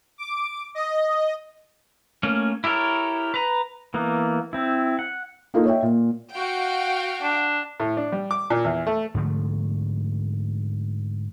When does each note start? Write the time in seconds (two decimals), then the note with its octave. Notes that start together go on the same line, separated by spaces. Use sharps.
0.18 D6
0.75 D#5
2.23 A3 A#3 C#4
2.64 E4 G4 A4 A#4 C#5
3.34 B4 A#5
3.94 E3 A#3 B3
4.53 C4 E4
4.99 F#5
5.54 A#3 D#4 F4 A4
5.66 C#5 D#5 E5 G5
5.82 A#2
6.32 F#4 F5 G5
7.22 D4
7.80 A2
7.97 D4
8.12 G3
8.31 D6
8.50 A#2
8.65 E2
8.87 A3
9.15 G#2 D3 F3 A3